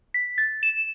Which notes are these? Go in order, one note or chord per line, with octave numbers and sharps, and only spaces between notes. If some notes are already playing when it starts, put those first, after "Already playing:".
B6
A6
E7